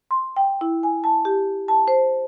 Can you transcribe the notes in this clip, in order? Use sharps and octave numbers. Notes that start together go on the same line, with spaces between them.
C6
G5
E4
G#5
A5
G4
A5
C5